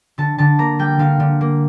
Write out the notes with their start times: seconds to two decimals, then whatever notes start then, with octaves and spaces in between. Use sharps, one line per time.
0.18 D3 A5
0.38 D3 A5
0.59 A#3 A#5
0.79 G3 G5
0.99 D3 F5
1.20 D3
1.41 A#3